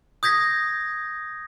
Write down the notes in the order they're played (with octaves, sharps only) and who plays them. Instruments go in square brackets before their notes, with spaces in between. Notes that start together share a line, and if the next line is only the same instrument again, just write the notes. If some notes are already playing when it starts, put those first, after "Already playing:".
[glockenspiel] D#6 G6 G#6 A#6 B6